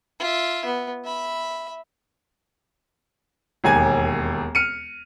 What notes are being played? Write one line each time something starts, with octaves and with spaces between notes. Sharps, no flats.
F4 E5
B3
E5 B5
E1 D#2 G#5 G#6
F6 C#7 D#7